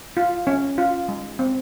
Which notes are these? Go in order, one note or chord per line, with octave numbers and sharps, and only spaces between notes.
F4
C#4
F4
G#3
C4